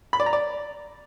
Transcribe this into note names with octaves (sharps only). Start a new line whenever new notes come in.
B5
D5
A#5
D5